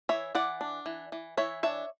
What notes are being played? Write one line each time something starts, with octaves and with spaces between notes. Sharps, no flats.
E3 C#5 E5
E3 D5 F#5
D4
E3
E3
E3 C#5 E5
D4 C#5 E5